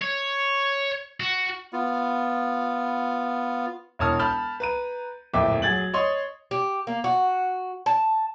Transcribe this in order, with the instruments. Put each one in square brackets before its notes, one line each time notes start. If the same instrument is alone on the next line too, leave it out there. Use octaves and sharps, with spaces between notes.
[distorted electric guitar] C#5
F#4
[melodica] B3 F4
[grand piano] E1 C#5 A5 D#6 F6
A5 B5 F6 G6
B4 A#5 D#7
D1 F2 A#2 E5 G5 D6
F#3 G#4 G#6 A6 F#7
C#5 D#5 C6 D#6
[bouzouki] G4
A#3
F#4
A5